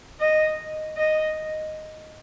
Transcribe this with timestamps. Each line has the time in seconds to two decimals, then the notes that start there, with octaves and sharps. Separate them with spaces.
0.20 D#5
0.97 D#5